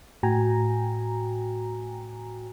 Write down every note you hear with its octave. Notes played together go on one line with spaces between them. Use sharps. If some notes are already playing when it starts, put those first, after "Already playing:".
A2 F#4 G5 G#5 A#5